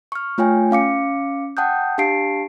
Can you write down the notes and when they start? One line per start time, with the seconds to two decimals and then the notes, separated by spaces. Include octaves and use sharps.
0.12 C#6 F6
0.38 A3 F4 C#5 G5 G#5
0.71 C#4 F5 D6 C#7
1.57 F#5 G5 A5 D#6 F#6 G6
1.98 D4 G4 F5 A5 C7 D7